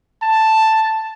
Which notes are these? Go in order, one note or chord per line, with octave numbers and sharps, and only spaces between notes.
A5